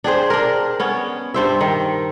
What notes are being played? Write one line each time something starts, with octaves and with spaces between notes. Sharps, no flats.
D4 G4 G#4 C5
D4 A#4
B3 C#4
G2 C5 E5
D#3